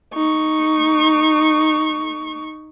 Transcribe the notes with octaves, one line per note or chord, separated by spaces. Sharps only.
D#4 C#6